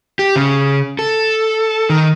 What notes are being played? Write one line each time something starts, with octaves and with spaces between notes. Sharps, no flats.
G4
C#3
A4
D#3